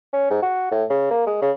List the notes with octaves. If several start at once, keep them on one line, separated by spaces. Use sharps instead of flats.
C#4
G#2
F#4
A2
C#3
A#3
G#3
C#3